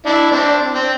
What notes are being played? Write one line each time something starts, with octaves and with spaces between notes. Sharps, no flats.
D4 E4
C4 D4
C4